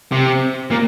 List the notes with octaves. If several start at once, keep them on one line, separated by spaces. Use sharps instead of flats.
C3
A#2